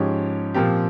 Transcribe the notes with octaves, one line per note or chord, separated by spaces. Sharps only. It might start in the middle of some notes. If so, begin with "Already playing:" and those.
Already playing: G#2 F3 G#3 C#4 G4
A#2 F3 C4 G4